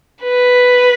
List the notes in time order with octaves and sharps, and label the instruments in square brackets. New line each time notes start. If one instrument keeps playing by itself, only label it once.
[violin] B4